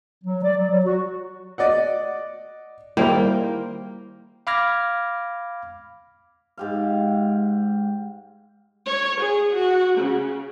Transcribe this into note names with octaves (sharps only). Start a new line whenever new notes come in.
F#3
D5
F#3
F#3
F#4
D5 D#5 F#5
D#3 G3 A#3 E4 A#4 C5 G5
F5 B5 D6 F6 G#6 A#6
G#2 G4 F5
C#5
G#4
F#4
C#3